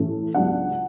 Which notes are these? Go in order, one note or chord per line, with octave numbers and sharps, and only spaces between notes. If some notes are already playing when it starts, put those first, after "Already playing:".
Already playing: A2 E3 A3 C#4
C#2 C#3 F#3 B3 D4 F#5